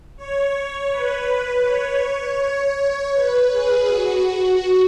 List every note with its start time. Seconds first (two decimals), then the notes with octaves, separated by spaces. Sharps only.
0.17 C#5
0.91 B4
1.65 C#5
2.02 C#5
2.40 C#5
3.14 B4
3.51 G#4
3.87 F#4